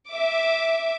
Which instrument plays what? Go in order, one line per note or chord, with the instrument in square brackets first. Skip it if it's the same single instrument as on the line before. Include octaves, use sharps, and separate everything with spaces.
[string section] E5 D6